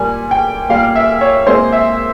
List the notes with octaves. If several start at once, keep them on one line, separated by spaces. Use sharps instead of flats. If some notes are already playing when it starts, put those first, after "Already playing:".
Already playing: A#2 G3 A#3 G#5
G5
A#2 G3 A#3 F5
E5
C#5
A#2 G#3 C4 C5
E5